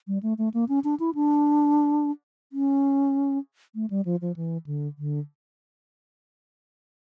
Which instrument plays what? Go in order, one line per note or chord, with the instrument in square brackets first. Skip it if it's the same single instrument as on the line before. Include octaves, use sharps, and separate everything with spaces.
[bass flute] G3
A3
A3
A#3
C#4
D4
E4
D4
C#4
A3
G3
F3
F3
E3
D3
D3